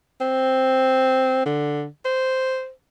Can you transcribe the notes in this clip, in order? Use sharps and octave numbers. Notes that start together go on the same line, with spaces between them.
C4
D3
C5